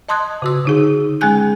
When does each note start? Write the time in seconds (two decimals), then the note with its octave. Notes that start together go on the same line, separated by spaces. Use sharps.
0.09 D#5 A5 C6 D#6 F#6 G#6
0.42 C#3 F#4 E6
0.65 D3 D#4 G#4
1.21 G#3 C#4 G#4 G#5 F#6 G6